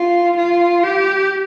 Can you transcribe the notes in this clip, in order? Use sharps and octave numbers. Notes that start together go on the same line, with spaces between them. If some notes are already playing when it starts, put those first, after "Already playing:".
Already playing: F4
F4
G4